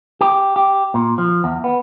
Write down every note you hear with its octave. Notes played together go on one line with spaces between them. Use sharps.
G4
G4
A#2
F3
E2
B3